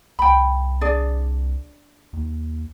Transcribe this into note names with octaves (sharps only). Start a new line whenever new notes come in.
C2 G5 B5
D4 G#4 D5
D#2